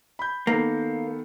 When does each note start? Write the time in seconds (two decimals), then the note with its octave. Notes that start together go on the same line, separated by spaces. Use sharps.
0.19 B5 G6
0.47 D#3 A#3 B3 A4